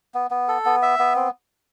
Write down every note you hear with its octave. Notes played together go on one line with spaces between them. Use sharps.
B3
B3
A4
B3
E5
B3
C4